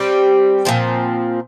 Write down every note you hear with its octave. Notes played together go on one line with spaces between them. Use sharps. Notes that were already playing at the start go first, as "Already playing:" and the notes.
Already playing: G3 C4 G4
A#2 F3 C4